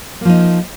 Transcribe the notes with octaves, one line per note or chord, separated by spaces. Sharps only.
F3 A#3 D#4